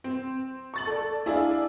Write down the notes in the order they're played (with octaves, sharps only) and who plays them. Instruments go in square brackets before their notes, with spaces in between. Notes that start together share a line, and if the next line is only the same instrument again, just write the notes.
[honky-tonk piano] C4
C#6 A6 F#7
A4 D5
[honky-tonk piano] D4 G#4 D5 [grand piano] E4 F5